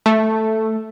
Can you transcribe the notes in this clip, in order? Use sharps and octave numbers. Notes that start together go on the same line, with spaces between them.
A3